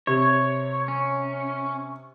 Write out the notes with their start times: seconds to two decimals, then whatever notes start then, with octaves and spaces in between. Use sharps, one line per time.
0.07 C3 C#5
0.88 C#4